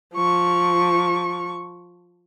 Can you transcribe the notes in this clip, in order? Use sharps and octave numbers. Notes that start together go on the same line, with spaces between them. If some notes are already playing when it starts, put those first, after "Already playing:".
F3 C#6